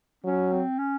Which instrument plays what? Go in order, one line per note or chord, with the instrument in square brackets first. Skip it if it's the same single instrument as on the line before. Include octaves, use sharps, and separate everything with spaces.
[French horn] F#3 [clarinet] C#4
[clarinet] C4
C#4